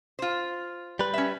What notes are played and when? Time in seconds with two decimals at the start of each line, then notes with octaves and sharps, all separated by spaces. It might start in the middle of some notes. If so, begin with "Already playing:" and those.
0.19 F4 C5
0.99 G3 B4
1.14 C#4 E5